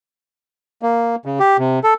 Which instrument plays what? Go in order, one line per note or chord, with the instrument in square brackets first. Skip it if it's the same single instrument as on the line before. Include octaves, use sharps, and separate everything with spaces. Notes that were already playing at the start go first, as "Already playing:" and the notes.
[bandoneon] A#3
C#3
G4
C3
A4